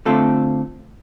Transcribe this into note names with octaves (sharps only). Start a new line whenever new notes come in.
D3 A3 C4 F4 A4